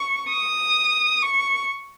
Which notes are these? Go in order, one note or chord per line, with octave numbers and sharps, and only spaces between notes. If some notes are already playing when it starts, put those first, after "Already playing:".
Already playing: C#6
D#6
C#6